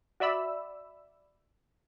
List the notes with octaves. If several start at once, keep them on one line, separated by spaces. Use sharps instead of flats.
F#4 D5 E5 B5 E6